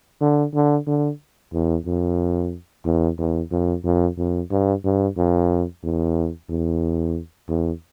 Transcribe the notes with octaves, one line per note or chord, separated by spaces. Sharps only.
D3
D3
D3
E2
F2
E2
E2
F2
F2
F2
G2
G2
F2
E2
E2
E2